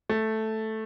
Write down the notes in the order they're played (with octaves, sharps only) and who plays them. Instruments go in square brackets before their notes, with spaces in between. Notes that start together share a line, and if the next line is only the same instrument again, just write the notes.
[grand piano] A3